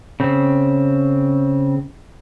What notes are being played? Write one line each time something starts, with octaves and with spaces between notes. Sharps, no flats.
C#3 C4